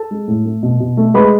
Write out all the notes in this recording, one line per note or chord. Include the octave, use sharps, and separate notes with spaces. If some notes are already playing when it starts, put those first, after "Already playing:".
Already playing: A4 A5
G#3
A2
A3
B2
B2
A3
G#3 B4 B5